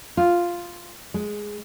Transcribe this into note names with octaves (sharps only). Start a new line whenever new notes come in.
F4
G#3